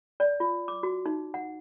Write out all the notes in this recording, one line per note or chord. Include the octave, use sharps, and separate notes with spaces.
D5
F4
D6
F#4
D#4
F#5